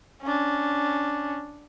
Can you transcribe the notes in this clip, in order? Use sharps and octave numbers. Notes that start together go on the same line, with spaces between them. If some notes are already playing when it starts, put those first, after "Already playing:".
C#4 D4